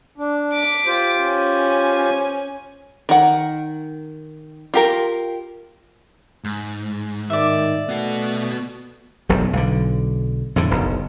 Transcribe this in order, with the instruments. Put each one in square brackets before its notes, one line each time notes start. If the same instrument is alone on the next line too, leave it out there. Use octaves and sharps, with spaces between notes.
[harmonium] D4
[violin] D6 B6
[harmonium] F4 G4 C5
[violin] C#4 G#5
[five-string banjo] D#3 F#5
F4 G4 A#4
[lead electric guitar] G#2
[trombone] D#3 [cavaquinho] D5 E5
[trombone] A3 [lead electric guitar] B3 F#4
[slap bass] E1 B1 F#2 G3
B1 D3
F2 A2 D3
F#1 B1